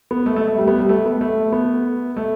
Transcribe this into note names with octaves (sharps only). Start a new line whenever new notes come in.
B3
A3
A3
A3
G3
B3
G3
A3
B3
A3
B3
A3